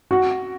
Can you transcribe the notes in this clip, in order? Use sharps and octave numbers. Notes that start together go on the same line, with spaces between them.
F#4